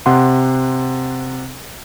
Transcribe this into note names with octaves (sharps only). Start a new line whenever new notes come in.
C3 F#5 C6